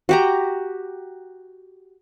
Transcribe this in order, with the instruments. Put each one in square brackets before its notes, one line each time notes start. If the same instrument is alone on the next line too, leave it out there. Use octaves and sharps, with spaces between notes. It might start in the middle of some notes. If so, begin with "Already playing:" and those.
[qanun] F#4 G4 A#5